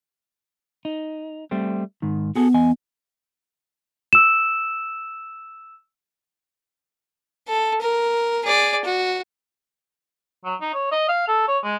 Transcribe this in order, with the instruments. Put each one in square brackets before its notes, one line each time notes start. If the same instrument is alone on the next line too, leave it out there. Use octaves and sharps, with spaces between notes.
[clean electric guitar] D#4
G3 A3 C4
G#2 D#3
[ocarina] B3 [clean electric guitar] F#4 G#4 A4
[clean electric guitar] E2 D#5 G#5
[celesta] E6 E7
[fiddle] A4
A#4
G#4 D5
F#4
[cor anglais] F#3
D#4
C#5
D#5
F5
A4
C#5
G#3